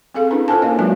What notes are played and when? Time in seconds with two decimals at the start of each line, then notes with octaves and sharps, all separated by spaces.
0.15 C4 G#4 A4 F5
0.31 C#4 D4 E4 B4
0.48 F4 A4 A#4 C5 G#5 A5
0.62 A#3 C#4 C#5 D#5 F5
0.79 F#3 G#3 F#4 B4 E5 G#5